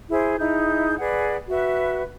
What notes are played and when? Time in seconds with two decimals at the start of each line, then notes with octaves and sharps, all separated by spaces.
0.10 E4 G#4 C5
0.39 D#4 E4 G#4 G6
0.99 G#4 B4 D5 F#5
1.49 F#4 B4 E5